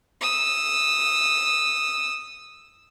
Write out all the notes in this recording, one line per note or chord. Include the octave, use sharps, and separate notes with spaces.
D#6 E6